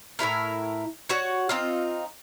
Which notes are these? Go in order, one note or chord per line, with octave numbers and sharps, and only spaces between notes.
A2 C3 E4 A#4
F#4 C#5 F#5
C4 D#4 F4